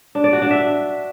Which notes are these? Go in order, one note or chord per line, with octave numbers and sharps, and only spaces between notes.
D4
D5
F#4
D4
E5